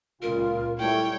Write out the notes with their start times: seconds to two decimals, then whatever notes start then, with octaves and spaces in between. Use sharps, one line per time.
0.22 C#2 A#2 F4 A#4
0.79 G3 A3 E4 C#5 G5